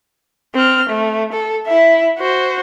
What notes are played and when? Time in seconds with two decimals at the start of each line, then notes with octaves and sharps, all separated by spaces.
0.55 C4 F6
0.89 A3
1.33 A4
1.67 E4 E5
2.19 F#4 C5